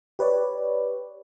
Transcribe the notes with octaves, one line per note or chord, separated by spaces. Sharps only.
G4 B4 C#5 D5